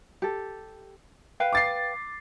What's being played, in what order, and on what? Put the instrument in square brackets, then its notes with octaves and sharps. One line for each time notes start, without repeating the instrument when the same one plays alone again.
[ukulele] G4 A4
B4 F5 G5
[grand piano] D6 A6 C7